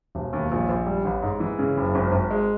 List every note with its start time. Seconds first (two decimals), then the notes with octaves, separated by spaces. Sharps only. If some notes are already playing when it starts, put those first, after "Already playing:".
0.15 E1
0.33 D#2
0.52 A#1
0.69 A#1
0.87 G3
1.05 A1
1.22 G#2
1.40 E3
1.59 C#3
1.77 F#1
1.95 G#1
2.12 G#1
2.31 G#3